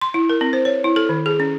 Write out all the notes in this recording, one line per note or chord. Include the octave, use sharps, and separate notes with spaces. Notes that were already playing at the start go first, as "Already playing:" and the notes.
C6
E4
A#4
C4
C5
C#5
E4
A4
D#3
G#4
C#4